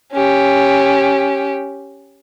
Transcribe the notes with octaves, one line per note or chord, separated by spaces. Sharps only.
C#4 G4